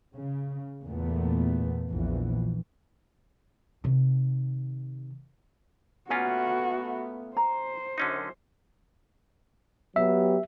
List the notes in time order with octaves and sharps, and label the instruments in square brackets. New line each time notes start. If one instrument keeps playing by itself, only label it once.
[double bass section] C#3
E2 A#2 A3 B3
A#1 E2 E3
[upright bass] C3 D#3
[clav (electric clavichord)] A#2 C#4 F4 [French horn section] A3 B3 [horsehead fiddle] F#4 [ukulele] G#5
[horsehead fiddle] C5 [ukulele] A#5
[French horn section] F#2 [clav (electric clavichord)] D3 C#4 D#4
[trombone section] F#3 B3 G4 [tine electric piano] E5